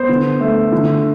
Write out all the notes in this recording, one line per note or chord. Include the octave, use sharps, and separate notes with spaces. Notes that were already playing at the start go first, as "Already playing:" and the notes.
Already playing: B3 C5
D3
A3
D3